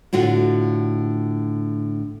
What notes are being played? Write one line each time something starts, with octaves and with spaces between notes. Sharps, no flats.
A2 D3 F4 F#4